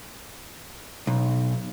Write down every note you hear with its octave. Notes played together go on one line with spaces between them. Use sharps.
B1